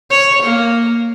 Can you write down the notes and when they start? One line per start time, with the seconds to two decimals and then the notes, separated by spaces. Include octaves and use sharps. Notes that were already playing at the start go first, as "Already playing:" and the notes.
0.10 C#5
0.43 A#3